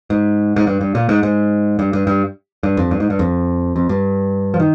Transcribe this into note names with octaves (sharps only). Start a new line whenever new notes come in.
G#2
G#2
G2
G2
A#2
G#2
G#2
G2
G2
G2
G2
F2
G2
G#2
G2
F2
F2
G2
F3
D#3